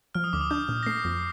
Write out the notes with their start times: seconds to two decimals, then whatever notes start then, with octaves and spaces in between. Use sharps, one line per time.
0.15 F3 F6
0.24 D#6
0.33 D2 D6
0.41 D#6
0.51 D4 G6
0.69 A#2
0.83 A#6
0.86 A3 C7
1.05 F2